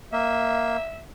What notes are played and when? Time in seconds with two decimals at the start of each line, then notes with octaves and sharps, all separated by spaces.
0.13 A#3 E5